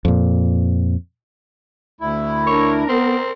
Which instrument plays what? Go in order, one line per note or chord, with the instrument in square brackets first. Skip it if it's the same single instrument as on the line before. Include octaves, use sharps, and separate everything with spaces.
[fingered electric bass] F2 A#2
[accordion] D2 E4
[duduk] D4 [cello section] A#4 [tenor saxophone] C#5
[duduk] B3 [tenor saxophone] C4